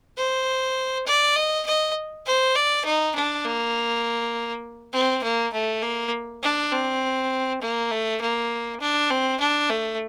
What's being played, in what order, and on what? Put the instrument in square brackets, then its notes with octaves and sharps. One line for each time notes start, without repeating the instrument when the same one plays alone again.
[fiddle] C5
D5
D#5
D#5
C5
D5
D#4
D4
A#3
C4
A#3
A3
A#3
D4
C4
A#3
A3
A#3
D4
C4
D4
A3